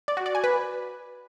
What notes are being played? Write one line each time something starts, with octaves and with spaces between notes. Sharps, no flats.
D5
F#4
D5
G#5
B4